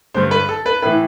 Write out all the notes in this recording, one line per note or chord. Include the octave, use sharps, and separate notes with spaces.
G2 D3 C5
B4
A4
B4
A2 E3 B4